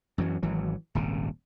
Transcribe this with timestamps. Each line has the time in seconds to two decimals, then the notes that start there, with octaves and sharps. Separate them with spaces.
0.18 F#2 E3 F#3
0.43 G#1 E3 F#3
0.95 D#1 G#1 C#3